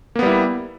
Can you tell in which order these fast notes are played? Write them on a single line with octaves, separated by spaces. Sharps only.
A#3 B3 G3 E4